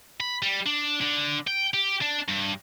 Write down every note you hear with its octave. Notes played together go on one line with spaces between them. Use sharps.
B5
G3
D4
D3
G5
G4
D4
G2